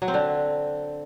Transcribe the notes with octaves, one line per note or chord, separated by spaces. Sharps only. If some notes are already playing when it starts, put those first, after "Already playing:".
F#3
C4
D3